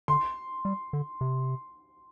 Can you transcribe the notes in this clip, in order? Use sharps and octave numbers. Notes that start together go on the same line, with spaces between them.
D3 C6
G3
D3
C3